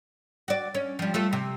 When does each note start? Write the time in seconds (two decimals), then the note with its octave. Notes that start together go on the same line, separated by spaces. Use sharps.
0.48 F#4 D5
0.74 C#4
0.99 F3 G3
1.14 A3 F4 A4
1.33 C3